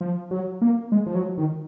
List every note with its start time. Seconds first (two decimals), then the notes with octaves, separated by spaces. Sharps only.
0.01 F3
0.31 F#3
0.62 A#3
0.92 G#3
1.06 F3
1.15 F#3
1.38 D#3